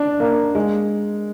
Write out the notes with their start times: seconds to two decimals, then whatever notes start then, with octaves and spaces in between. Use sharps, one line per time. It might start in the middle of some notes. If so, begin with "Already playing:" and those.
Already playing: D4
0.20 A#3
0.55 G#3